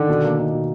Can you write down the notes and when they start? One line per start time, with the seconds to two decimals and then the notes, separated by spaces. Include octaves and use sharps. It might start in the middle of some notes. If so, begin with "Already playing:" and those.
Already playing: D3 D#3
0.09 B2
0.23 A#3
0.38 D#4
0.53 B2